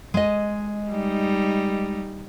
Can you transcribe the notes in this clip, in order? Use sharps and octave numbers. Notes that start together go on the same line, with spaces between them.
G#3 D#5
G3 D#4